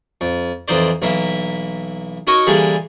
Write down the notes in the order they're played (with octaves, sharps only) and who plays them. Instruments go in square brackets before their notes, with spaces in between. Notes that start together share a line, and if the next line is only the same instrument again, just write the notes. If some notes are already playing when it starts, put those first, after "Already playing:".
[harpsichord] F2
F2 E3 D#4 C5 D5
B1 E3 A#3 E5
D#4 F#4 A#4 C#5 D#5
D3 E3 G3 G#3 A#3 D4